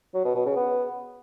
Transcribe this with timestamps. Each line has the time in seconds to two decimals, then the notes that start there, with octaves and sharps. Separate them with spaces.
0.14 F#3
0.24 B2
0.35 B2
0.46 C#3
0.56 B3